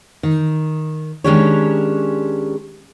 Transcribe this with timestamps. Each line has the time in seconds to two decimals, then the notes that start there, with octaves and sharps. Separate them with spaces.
0.23 D#3
1.24 D#3 G#3 C#4 D4 G4 C#5